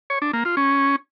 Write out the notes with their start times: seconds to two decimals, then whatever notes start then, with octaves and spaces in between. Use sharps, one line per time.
0.10 C#5
0.22 D4
0.33 A#3
0.45 F4
0.57 C#4